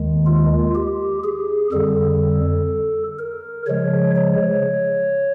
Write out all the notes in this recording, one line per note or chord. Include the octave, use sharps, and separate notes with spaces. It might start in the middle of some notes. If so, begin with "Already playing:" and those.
Already playing: D#2 D#3 G#3
F4
G4
G#4
F2 D3 G3 A4
A#4
C#3 F3 G#3 C#5
C#5